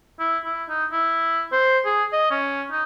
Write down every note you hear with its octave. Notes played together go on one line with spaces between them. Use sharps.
E4
E4
D#4
E4
C5
G#4
D#5
C#4
D#4